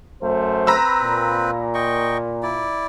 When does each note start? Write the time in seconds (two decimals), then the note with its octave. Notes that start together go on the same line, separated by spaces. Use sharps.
0.22 F#2 A3 C5
0.67 C4 B4 A#5 B5 E6
1.01 A#2
1.74 D#5 G5 C#6
2.43 E4 D5